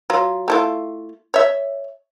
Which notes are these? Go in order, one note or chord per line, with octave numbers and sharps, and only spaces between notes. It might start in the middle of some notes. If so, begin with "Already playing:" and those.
F#3 F4
A3 E4 F4
C#5 E5